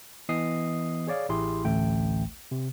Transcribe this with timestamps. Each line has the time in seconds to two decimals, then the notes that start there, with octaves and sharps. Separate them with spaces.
0.29 E3 B3 D#5 D#6 C7
1.07 G#4 C#5 D5 F5
1.29 A1 E4 G4 G#4 C6
1.65 A1 D2 A3 G5
2.51 C3